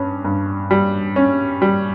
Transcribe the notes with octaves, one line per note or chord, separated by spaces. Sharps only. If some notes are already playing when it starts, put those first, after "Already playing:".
Already playing: G2 C#4
G2
G3
C#4
G3